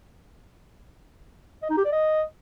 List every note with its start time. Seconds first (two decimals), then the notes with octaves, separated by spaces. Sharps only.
1.62 D#5
1.70 D#4
1.77 G4
1.85 D5
1.92 D#5